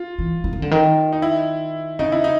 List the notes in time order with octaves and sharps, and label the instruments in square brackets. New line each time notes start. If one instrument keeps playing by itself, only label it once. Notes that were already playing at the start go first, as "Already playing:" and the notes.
Already playing: [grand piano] F4
[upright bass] E3
E3
D#3
D3
D#3
[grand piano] D#4
E4
[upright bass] C#3 [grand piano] D#4
[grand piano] E4
D#4